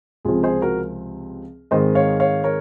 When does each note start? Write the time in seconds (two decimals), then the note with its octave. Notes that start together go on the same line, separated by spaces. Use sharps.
0.25 C#2 C3 F3 C4 F4 G#4
0.43 G#4 C5
0.62 F#4 A#4
1.71 G#2 D#3 G#3 C4 C5 D#5
1.95 C#5 F5
2.20 C#5 F5
2.44 A#4 C#5